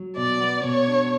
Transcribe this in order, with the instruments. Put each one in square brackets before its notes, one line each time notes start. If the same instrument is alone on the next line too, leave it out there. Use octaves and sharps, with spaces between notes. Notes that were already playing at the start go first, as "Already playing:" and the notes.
Already playing: [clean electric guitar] F#3
[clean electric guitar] B2 [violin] D5
[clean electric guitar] B3
[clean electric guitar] B2 [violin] C#5
[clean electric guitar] D4